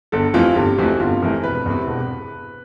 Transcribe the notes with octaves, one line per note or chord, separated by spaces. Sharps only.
G1 A4
F2 C3 E3 A3 F4
G1 G4
F2 C3 E3 A3 F#4
G1 F4
F2 C3 E3 A3 A#4
E1 B4
E2 C3
E1